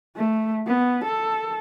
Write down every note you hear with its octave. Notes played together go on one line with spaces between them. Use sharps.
A3
B3
A4